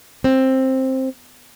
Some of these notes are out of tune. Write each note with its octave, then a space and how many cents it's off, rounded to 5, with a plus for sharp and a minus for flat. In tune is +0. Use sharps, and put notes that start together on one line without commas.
C4 +10